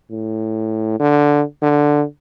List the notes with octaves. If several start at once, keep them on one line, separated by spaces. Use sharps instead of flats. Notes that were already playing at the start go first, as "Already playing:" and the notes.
A2
D3
D3